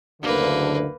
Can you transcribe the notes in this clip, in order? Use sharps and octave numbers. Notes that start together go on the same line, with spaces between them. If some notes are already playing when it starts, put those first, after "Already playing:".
F#1 D2 D3 A#3 B4